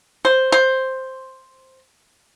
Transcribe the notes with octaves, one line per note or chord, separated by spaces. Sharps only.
C5
C5